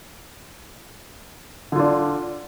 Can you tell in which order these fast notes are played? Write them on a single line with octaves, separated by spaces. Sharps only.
D3 F4 D4